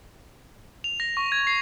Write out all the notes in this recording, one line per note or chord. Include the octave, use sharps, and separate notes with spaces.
F7
A#6
C#6
G#6
C7